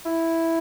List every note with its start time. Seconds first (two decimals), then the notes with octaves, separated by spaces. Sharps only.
0.05 E4